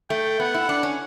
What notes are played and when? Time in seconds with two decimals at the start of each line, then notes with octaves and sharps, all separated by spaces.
0.10 A3 G5
0.40 B3 F#5
0.54 E4
0.69 D4
0.83 C#4